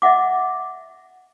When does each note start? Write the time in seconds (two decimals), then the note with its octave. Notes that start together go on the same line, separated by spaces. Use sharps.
0.02 D#5 E5 F#5 D6